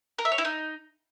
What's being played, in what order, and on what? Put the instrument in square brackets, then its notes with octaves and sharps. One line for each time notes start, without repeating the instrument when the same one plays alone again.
[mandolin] A#4
E5
C#5
E4
D#4